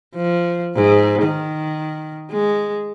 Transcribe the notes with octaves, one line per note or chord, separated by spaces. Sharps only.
F3
G#2
D#3
G#3